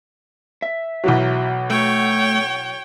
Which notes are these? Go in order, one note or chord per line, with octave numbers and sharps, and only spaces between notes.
E5
B1 E3 F#3
A3 C#5 G5